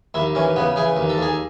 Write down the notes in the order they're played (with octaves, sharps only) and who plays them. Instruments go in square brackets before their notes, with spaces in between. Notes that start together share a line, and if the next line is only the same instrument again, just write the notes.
[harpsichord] D#2 E4
E3 C#4
C#3 B3
E3 G#4
D#2
A4
D#2 G#4